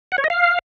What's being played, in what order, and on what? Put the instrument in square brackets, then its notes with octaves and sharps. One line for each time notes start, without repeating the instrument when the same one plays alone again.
[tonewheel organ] F#5
C#5
D#5
F5